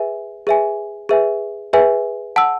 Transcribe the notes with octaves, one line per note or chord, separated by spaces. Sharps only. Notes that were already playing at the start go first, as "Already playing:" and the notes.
Already playing: G#4 B4 E5 G#5
G#4 B4 E5 G#5
G#4 B4 E5 G#5
G#4 B4 E5 G#5
F#5 A5 E6